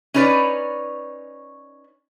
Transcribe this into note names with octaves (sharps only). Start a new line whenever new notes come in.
C#4 D#4 B4 C#5 D5